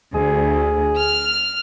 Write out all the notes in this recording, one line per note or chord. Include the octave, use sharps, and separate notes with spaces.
D2 G#4
F6